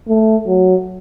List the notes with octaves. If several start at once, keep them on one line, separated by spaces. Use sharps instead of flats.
A3
F#3